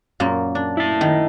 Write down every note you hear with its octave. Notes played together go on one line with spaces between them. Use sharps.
F#2 A#2 A#3
D4
E4 A5
D#3